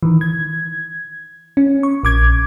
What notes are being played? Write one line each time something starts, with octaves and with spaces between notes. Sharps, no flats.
D#3 E3
G#6
C#4
C#6
A#1 D6 G#6